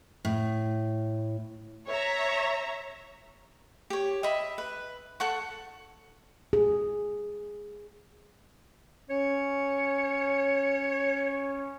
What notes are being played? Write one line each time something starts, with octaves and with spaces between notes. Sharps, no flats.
A2
C#5 E5 A#5
G4 C#5
D#5 E5 B5
B4
A4 F#5 C#6
G#4
C#4 C#5